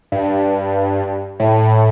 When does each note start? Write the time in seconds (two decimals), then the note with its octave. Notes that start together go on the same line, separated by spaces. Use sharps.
0.12 G2
1.40 A2